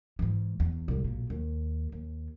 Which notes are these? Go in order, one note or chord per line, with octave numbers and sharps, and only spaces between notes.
G#2 E3
E2
C2 G#2
B1 A#2
D#2
D#2